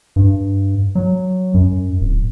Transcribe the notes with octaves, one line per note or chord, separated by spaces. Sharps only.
G2
F#3
F#2
D1